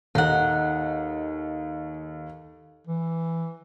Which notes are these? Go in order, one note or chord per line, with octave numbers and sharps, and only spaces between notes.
D#2 D#4 A4 D#5 F#5
E3